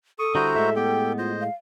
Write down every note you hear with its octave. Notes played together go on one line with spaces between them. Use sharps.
A4 C#6 D#6
D3 G3 E4 F#4 C5 A#5
A2 G#3 E5
B3 G4 G5
F4 C5 D#5
F5